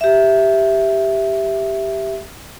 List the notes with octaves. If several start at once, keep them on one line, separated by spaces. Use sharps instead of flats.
G4 E5